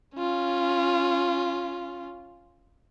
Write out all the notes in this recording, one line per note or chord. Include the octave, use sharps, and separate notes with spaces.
C#4 F4